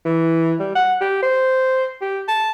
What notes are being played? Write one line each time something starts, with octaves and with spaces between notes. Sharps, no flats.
E3
G3
F#5
G4
C5
G4
A5